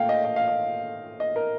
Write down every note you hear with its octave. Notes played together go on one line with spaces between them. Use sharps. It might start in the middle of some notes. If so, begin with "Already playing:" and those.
Already playing: A#2 A3 F5 G5
D#5
D#5
F5
D#5
D#5
A#4